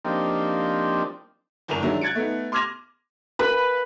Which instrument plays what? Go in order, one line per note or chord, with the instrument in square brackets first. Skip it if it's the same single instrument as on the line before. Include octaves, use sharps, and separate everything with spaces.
[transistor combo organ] F3 A#3 C4 D4 D#4 G4
[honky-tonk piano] G1 E2 A#4 F7
D#3 F#3 G#3 C#4 D4 E4
F#6 G#6 A6 C#7 D7
A3 B3 D#4
C6 D6 F6 G#6 A#6 F7
[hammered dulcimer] B4